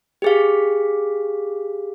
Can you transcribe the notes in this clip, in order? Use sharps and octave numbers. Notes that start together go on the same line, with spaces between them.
G4 G#4 F5